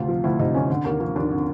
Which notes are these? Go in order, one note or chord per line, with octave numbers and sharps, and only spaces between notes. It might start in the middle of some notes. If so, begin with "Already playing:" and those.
Already playing: D2 C3 F4
F3
D2 E4
C3 D#4
D2 C#4
D3
D#2 A#3
F3 A#3
D#2 D4
D3